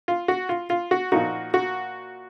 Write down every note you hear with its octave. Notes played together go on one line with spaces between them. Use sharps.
F4
F#4
F4
F4
F#4
A#2 F3 A#3 D#4 F#4
F#4